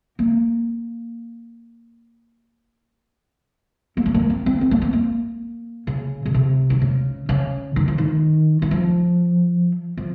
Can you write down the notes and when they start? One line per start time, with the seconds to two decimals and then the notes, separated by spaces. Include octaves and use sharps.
0.19 A#3
3.97 A#3
4.06 A3
4.14 A#3
4.30 C4
4.46 C4
4.61 C4
4.71 A#3
4.82 C4
4.93 A#3
5.87 C#3
6.25 C#3
6.34 C3
6.70 D#3
6.81 C#3
7.29 C#3
7.76 D#3
7.88 F3
7.98 D#3
8.62 D#3
8.71 F3
9.97 F3